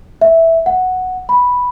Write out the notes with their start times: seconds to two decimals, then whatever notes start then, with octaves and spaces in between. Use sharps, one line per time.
0.21 E5
0.66 F#5
1.29 B5